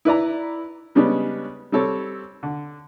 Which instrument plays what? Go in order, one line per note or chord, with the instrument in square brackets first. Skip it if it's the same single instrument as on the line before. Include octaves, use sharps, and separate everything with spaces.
[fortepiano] E4 B4 D5 A#5
C#3 G3 G#3 B3 C#4 D4
G3 C4 A4 C#5
D3